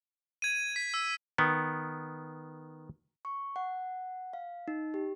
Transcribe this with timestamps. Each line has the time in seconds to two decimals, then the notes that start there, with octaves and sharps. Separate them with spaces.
0.42 G#6 D#7
0.76 B6
0.94 E6
1.38 D#3 B3
3.25 C#6
3.56 F#5
4.33 F5
4.68 D#4
4.94 G4